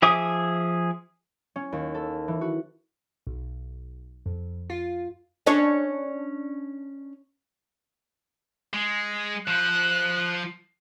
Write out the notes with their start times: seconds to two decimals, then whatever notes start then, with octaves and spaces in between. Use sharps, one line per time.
0.02 F3 G#4 E5 D6 D#6
1.56 C#4
1.72 D#2
1.95 A4
2.28 E3
2.41 F#4
3.27 B1
4.26 F2
4.70 F4
5.46 C#4 D4 C#5
8.73 G#3
9.47 F3 C5 F#6